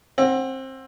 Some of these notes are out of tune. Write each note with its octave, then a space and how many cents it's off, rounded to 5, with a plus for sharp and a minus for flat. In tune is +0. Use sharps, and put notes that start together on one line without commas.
C4 +20 F#5 +0